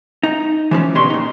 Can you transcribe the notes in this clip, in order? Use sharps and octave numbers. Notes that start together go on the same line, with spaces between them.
D#4
E3 F3 A#3 C#4
E2 B2 D3 G4 C#5 C6
A#2 D#4